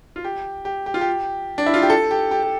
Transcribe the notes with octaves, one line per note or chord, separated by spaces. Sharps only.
F4
G4
G4
G4
F4
G4
D4
E4
F4
G4
A4
G4
G4
G4